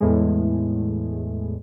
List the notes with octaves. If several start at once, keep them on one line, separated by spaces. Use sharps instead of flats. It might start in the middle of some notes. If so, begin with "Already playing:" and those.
E2 A2 G#3